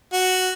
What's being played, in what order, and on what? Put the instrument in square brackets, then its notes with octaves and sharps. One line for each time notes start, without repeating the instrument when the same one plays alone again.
[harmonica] F#4